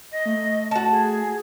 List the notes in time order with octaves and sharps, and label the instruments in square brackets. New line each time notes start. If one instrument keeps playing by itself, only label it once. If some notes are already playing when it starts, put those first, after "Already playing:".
[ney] D#5 [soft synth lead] A#6
[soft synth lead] A3
[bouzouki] F#4 A5
[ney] G#4